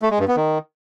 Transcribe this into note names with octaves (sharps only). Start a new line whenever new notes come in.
A3
G#3
G2
B3
D#3